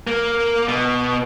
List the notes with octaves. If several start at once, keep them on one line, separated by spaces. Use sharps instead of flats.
A#3
B2